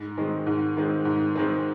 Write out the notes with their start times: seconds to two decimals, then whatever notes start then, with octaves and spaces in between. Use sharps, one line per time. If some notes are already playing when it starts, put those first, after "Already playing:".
Already playing: G#2
0.17 D#3 G#3 C4
0.46 G#2
0.77 D#3 G#3 C4
1.05 G#2
1.36 D#3 G#3 C4